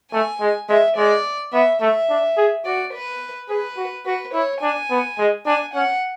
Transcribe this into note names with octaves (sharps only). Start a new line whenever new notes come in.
A3 G#5
G#3
G#3 E5
G#3 D5
B3 E5
A3 E5
D4
G#4
F#4 D5
B4
G#4 B4
F#4
F#4 B4
E4 C#5
D4 G#5
B3
G#3
D4 G#5
C#4 F#5